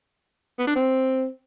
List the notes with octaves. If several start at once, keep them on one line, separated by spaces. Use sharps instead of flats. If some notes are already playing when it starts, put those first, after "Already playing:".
B3
D4
C4